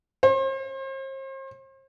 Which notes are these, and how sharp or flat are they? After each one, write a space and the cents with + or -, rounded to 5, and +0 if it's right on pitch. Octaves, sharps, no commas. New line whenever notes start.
C5 +40